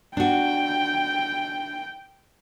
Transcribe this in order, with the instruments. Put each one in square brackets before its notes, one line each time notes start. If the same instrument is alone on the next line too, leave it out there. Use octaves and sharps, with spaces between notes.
[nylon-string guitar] D4 F#4 [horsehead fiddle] G5